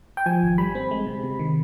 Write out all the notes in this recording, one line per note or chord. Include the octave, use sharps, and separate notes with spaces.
G5
F3 G#5
G#1
G3 B5
C4
G#3
C3
C3
D#3